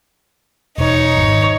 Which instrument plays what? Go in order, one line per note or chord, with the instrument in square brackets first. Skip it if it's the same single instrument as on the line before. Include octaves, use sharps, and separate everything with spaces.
[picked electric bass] E1 [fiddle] D#4 C#5
[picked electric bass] G#1